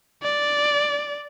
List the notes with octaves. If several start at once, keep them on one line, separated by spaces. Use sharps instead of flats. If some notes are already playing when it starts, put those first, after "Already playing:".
D5